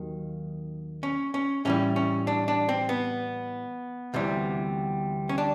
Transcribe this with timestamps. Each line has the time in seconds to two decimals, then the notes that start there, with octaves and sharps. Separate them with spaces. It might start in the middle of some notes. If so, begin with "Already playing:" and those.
Already playing: D#2 D#3 F#3
1.03 C#4
1.34 C#4
1.65 A2 E3 G3 C#4
1.96 C#4
2.27 D4
2.48 D4
2.69 C4
2.89 B3
4.14 D2 C3 E3 G3
5.29 C#4
5.38 D4